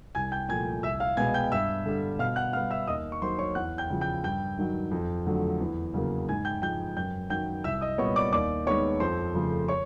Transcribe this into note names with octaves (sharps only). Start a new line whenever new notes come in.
C2 G#5 G#6
G5 G6
A#2 F3 A3 G#5 G#6
C2 E5 E6
F5 F6
B2 G#3 B3 G#5 G#6
G5 G6
G2 E5 E6
D3 G3
B2 F5 F6
F#5 F#6
G3 B3 F5 F6
E5 E6
D#2 D#5 D#6
C#6
D#3 F#3 A#3 C5 C6
C#5 C#6
E2 F#5 F#6
G5 G6
C#3 F3
G5 G6
G2 G5 G6
D#3 F#3
F2
D3 F#3 A3
E2
C#3 F#3 A#3
G#2 G#5 G#6
G5 G6
F3 G#3 G5 G6
F#2 G5 G6
D#3 F#3 G5 G6
C2 E5 E6
D#5 D#6
A#2 G3 B3 C#5 C#6
D5 D6
D#2 D5 D6
D#3 G#3 B3 C#5 C#6
F2 C5 C6
C#3 F3 A3
C#5 C#6